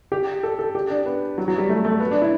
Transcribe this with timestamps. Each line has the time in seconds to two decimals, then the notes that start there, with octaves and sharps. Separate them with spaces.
0.12 G4
0.43 A4
0.59 A4
0.75 G4
0.90 D4
1.06 B3
1.38 F#3
1.48 F#3
1.58 G3
1.69 A3
1.85 A3
2.00 B3
2.11 D4
2.22 E4